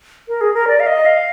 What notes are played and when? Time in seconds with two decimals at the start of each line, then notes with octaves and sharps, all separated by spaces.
0.28 A#4
0.41 G#4
0.54 A#4
0.68 D5
0.80 F5
0.87 D#5
1.06 F5